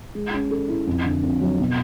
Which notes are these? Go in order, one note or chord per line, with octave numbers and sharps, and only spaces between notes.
G#3
C#4
A4
E4
F2
D3
F2
F#3
B2